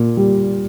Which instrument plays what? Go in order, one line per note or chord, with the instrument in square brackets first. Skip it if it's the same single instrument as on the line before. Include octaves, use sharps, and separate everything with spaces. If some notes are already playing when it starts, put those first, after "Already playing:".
Already playing: [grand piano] A#2
G3